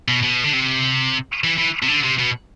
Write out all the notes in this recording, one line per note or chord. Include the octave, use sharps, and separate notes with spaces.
B2
B2
D3
C3
E3
E3
C3
D3
C3
B2